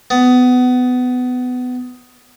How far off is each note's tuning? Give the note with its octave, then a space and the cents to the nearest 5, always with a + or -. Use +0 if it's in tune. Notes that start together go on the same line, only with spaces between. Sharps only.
B3 +20